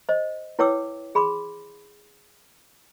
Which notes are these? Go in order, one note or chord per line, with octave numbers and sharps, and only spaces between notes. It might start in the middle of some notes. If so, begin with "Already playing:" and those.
C5 D#5
E4 B4 C#5 G5 D6 E6
G#4 B5 C6 D6